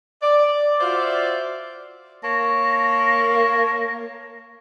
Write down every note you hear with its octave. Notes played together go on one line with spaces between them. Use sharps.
D5
F4 F#4 C5 D5 E5 F5
A#3 C#5 A5 A#6